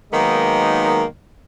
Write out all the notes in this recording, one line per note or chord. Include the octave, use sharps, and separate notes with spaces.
D#3 F#3 G#3 A#3 B3 D#4